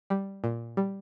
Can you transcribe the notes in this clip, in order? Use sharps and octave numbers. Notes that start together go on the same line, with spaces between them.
G3
A#2
G3